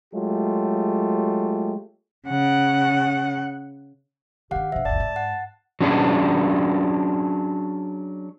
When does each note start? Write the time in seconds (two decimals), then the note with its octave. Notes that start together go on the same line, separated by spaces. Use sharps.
0.14 F#3 G#3 A3 F4 G4
2.28 C#3 F#5
4.51 D#3 D4 G4 F5 F#5
4.72 B1 F3 D4 E5
4.85 F#1 C#2 D5 A5
5.00 G#2
5.16 F#5
5.81 F#3 C#4 D4 G#4